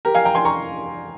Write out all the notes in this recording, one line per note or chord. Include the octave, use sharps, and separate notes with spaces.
G4 A#4
F5 G#5
G5 A#5
G#5 C6
A#5 C#6